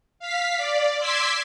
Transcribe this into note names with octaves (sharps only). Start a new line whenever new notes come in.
F5 B6
D5
C6 D6 E6 G#6 B6 C7